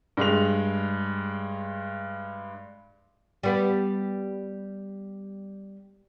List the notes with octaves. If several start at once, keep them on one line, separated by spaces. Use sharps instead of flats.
G2 G#3 F7
G3 B3